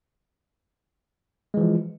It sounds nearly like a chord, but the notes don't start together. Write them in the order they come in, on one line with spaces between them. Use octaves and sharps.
G#3 E3 F3